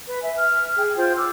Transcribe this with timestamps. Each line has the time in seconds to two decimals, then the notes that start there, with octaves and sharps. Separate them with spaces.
0.08 B4
0.22 E5 G#5
0.37 F6
0.77 G#4 G5
0.97 F4 C5 G5
1.18 D6 E6